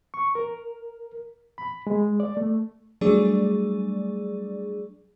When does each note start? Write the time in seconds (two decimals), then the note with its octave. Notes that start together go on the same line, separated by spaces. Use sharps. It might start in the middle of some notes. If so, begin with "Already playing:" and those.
0.14 C#6
0.35 A#4
1.58 B5
1.87 G#3
2.20 D5
2.37 A3
3.01 F#3 G3 A3 D4 G#4 D5